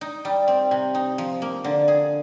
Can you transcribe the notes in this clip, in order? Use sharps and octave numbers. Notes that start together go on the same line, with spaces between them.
D#4
G3
C4
C3
D#4
F3
A#3
D3
G#4